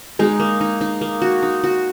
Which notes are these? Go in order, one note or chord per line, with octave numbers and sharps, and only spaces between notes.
G#3 D#4
A#3
D#4
D#4
A#3
F#4
D#4
F#4